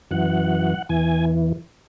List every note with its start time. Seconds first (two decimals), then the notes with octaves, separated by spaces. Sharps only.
0.11 F#2 E3 F#5
0.89 E2 E3 G#5